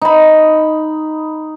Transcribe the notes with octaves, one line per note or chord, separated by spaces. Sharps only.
D#4 B5